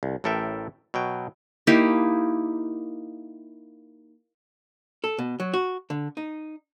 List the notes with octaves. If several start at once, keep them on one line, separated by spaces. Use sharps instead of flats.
C2
A1 A2 A4 A#4 E5 G5
B2 F#3 G5
A#3 D#4 E4 G4
A4
B2
F#3
F#4
D3
D#4